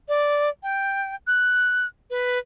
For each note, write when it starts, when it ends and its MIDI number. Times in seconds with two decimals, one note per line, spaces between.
0.09 0.49 74
0.63 1.15 79
1.27 1.86 90
2.10 2.38 71